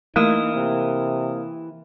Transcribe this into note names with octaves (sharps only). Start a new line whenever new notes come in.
E3 A3 A#3 D#4 A#4 D#6
C3